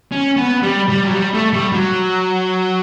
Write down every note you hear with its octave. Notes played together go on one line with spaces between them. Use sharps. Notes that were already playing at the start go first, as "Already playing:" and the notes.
C#4
B3
G3
G3
F#3
G3
A3
G3
F#3